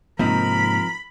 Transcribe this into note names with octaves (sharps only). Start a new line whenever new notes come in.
G#2 C3 F3 A#3 C4 D#4 A#4 B5